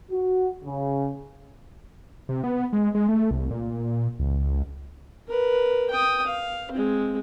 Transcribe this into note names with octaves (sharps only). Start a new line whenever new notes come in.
F#4
C#3
C3
B3
G#3
G#3
A3
C2
A#2
A#2
C#2
A#4 B4
G5 D#6
F5
G#3 C4